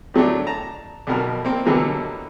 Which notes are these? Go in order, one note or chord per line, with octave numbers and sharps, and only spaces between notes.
A2 F#3 A3 D4
A5 A#5
B1 F2 B2 A#4
A#3 C4
B2 D3 E3 F#3 G3 A#3